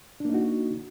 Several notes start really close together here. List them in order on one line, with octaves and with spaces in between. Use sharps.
D4 A#3 D#4 F#4